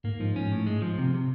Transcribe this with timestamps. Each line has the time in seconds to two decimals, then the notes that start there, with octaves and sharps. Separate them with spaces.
0.04 G#2 A#3
0.20 G#2 F3
0.36 G#2 C#4
0.52 A2
0.66 G#3
0.82 F3
0.99 C3
1.14 C3